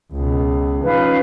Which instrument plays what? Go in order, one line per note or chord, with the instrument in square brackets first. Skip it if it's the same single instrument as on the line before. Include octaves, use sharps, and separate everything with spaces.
[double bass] C#2 B2
[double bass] F3 C#4 [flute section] D#4 B4 F5